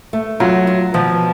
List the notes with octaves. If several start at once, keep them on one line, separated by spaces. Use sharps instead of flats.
A3
F#3 F4
F4
B2 F3